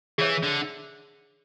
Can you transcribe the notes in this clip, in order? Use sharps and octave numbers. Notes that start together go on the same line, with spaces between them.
E3 G#4 C#5 E5
D3